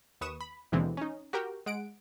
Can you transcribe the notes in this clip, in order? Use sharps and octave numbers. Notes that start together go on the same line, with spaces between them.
D#2 B4 C#6 D#6 E7
B5
D#2 B2 D3 E3 G#3 C4
C#4 D#4
F#4 G4 A#4 G5
G#3 F#5 D7